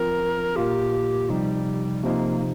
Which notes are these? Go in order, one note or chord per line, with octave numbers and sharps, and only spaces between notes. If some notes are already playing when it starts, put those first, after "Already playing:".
Already playing: F3 C4 F4 A#4
A#2 A#3 F4 G4
C3 F3 G3 D#4
C3 F3 A#3 D#4